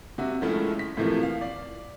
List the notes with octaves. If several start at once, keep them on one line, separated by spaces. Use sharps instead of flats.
C3 F#4 E5
D#3 F3 G#3 A3 C#4 E4
B6
A2 C3 E3 F3 A3 A#3
F5
D5